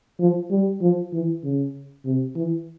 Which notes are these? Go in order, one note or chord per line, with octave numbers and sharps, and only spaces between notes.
F3
G3
F3
E3
C#3
C3
E3